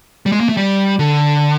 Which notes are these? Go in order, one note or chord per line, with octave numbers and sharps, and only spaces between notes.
G3
G#3
A#3
A3
G3
D3